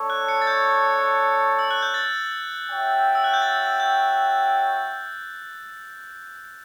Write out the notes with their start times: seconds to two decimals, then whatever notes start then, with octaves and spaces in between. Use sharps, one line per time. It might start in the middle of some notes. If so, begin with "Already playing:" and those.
Already playing: A3 D4 A4 C#5
0.10 F#6
0.28 C#7
0.42 A6
0.47 G6
1.59 E6
1.71 F#6
1.82 G6
1.94 A6
2.69 F#4 C#5 E5 G5
3.15 E6
3.24 F#6
3.34 G6
3.42 A6
3.80 G6